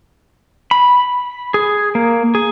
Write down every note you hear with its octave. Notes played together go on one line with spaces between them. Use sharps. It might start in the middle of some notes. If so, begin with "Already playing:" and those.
B5
G#4
A#3
G#4